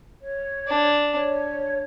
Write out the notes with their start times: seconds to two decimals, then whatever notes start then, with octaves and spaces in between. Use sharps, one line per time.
0.22 C#5
0.67 D4
1.13 C#5